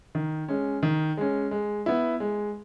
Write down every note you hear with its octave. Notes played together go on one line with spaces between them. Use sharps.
D#3
G#3 C#4
D#3
G#3 C#4
G#3
B3 E4
G#3